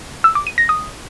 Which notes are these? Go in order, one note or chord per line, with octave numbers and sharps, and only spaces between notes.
E6
D6
D#7
A#6
D#6